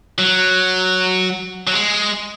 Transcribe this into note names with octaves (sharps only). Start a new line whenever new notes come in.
F#3
F#3
G#3